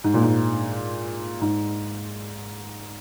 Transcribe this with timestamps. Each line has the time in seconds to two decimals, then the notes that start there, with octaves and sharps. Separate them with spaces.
0.04 G#2
0.14 A#2
0.23 G#2
1.41 G#2